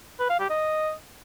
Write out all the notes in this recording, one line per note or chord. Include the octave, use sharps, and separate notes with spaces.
B4
F5
G4
D#5